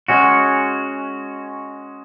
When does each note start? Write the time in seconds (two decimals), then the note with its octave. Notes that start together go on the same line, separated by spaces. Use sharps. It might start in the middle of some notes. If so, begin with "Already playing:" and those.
0.08 G#3 C#4 F#4